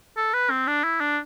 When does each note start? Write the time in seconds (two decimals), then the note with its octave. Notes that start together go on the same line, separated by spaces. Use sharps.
0.17 A4
0.34 B4
0.50 C4
0.67 D4
0.84 E4
1.01 D4